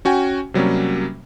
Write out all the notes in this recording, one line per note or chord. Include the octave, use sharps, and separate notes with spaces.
C#4 F#4 G5 G#5
C3 F#3 G3 A#3 C#4